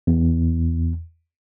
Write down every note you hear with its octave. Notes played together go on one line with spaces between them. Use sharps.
E2